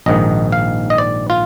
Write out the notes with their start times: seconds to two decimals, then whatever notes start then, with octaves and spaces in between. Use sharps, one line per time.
0.06 A#1 G#2 D#3 D#5
0.52 F5
0.90 D#5
0.98 D5
1.30 F4